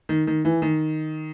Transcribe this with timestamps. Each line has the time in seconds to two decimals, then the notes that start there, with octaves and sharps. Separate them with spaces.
0.09 D#3
0.27 D#3
0.45 E3
0.62 D#3